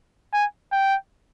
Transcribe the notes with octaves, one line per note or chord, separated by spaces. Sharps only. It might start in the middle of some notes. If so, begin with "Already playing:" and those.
G#5
G5